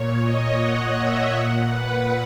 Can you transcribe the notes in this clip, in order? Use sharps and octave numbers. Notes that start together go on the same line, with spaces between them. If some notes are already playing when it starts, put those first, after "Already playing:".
Already playing: A#2 C#5
D#5
F#5
E5
A#2 F#5
B4